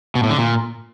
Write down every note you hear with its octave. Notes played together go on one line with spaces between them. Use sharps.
B2
A2
D3
A#2